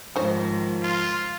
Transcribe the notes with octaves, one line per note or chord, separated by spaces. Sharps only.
G#2 D#3 F3 D#4 C5 C#5
F4